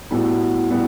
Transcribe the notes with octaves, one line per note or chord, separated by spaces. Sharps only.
A2 G3 B3 F#4 A4
A2 G3 B3 F#4